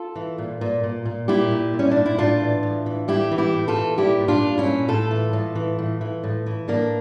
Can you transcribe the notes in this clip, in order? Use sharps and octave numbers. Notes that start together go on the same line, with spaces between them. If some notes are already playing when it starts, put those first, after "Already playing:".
Already playing: F4 A4
E3
A#2
A#2
A#2
A#2
A#2 E4 G4
A#2
A#2
C#4
D4
A#2
E4
A2 D4 F4
E3
A2
E3
A2 E4 G4
E3
E4 G4
A2
F4 A4
E3
A#2 E4 G4
A#2
D4 F4
A#2
C#4 E4
A#2
A2 F4 A4
E3
A2
E3
A2
E3
A2
E3
A2 A#3 D4